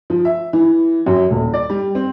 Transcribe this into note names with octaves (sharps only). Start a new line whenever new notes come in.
F3
E5
E3
F#2
D#1
D5
G3
C4